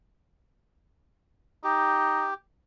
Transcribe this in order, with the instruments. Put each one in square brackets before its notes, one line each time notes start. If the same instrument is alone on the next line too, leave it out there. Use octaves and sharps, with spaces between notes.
[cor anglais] D#4 [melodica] G4